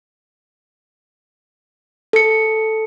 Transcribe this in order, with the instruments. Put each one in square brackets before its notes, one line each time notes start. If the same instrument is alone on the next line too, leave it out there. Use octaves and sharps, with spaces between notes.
[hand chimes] A4 C#7